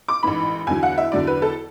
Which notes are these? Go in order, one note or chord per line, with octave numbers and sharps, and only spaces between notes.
D6
A1 G#2 E3 B5
E2 D3 F#3 G#5
F#5
E5
E2 D3 F#3 D5
B4
A4